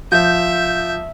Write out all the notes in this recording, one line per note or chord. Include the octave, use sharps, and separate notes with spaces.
F3 E5 G6